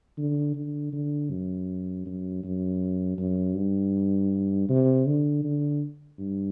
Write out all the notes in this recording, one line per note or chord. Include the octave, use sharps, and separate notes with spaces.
D3
D3
D3
F#2
F#2
F#2
F#2
G2
C3
D3
D3
G2